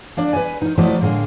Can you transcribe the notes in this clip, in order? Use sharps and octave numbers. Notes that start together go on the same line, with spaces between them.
A#3 D4 D5
B4 G#5
D#4 A#4
F3 F#3 A3 E4 D5 D#5
A2 D3 G#3 A#3